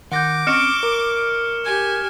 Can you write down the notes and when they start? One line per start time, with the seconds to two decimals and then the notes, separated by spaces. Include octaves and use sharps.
0.12 D#3 F#5 D6 G6 A#6
0.47 C4 C#4 D#5 C#6 F6 C#7 D7 E7
0.83 A#4
1.65 G4 G#5